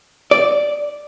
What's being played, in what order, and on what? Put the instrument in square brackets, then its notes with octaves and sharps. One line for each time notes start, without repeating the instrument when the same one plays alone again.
[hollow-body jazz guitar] D5